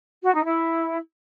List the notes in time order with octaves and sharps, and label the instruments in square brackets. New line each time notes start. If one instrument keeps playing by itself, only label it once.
[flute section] F#4
D#4
E4